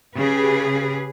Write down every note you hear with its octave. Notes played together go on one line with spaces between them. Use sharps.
C#3 G4 G#4 B4